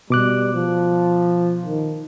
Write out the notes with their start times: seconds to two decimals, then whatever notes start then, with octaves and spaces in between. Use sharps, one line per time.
0.10 B2 G3 D6 F#6
0.54 F3
1.66 D#3